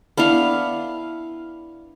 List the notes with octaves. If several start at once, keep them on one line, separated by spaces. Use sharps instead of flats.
B3 D4 E4 F5